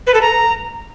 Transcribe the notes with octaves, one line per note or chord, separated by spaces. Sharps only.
B4
A4
A#5